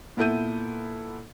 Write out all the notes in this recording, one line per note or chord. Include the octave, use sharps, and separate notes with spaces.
A#2 B3 E4 A4 G6 D#7